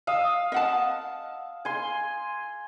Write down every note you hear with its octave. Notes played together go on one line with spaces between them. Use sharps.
F5 D#6 E6
D#5 F#5 A5
G#5 C6